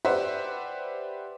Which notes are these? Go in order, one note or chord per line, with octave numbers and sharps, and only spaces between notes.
G4 B4 C5 D5 E5 F#5